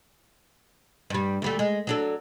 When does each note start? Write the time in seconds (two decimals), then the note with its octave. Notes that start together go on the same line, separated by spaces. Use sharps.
1.10 G2 G3
1.42 D2 G3 A3
1.59 G#3
1.87 F#3 D4 A4